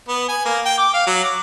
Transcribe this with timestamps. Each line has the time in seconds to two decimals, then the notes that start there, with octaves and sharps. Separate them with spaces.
0.08 B3
0.28 G#5
0.45 A#3
0.65 G5
0.78 D6
0.93 F5
1.07 F#3
1.24 D6